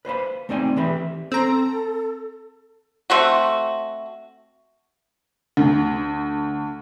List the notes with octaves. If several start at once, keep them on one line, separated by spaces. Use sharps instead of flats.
B4 C5 F5 B5
A3 C4 D#4 D5 G5 G#5
E3 G4 B4 E5 B5
C4 A4 A#5
A3 C4 F#4
D2